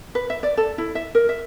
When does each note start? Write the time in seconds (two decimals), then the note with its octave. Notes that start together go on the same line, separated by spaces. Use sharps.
0.15 B4
0.30 E5
0.43 D5
0.57 A4
0.78 E4
0.95 E5
1.15 A#4
1.29 E5